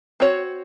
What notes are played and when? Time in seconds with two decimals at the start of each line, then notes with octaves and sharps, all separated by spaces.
0.20 C4 F#4 C#5